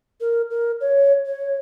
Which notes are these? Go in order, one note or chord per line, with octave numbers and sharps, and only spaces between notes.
A#4
A#4
C#5
C#5